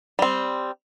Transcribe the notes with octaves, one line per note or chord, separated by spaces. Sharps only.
G3 C4